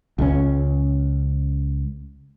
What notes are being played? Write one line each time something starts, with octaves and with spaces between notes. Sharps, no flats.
C#2 F3 C#4